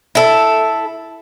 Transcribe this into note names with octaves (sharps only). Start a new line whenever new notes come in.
E4 A4